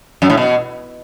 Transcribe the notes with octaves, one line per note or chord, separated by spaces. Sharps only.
F#2
A2
B2